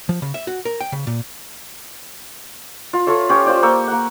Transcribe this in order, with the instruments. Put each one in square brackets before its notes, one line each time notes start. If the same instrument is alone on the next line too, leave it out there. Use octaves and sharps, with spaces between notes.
[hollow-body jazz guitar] F3
C#3
E5
F#4
A#4
G5
C#3
A#2
[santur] F4
F4 A4 C#5 E5
C#4 G4 C#5
F4 C5 D5
A#3 G5 C#6 E6
A#3 F#5